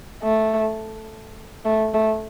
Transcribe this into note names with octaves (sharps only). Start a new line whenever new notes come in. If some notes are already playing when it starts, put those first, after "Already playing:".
A3
A3
A3